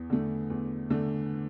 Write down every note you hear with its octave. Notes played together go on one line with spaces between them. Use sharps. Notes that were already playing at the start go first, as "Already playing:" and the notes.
Already playing: E2
D3 A3
E2
D3 A3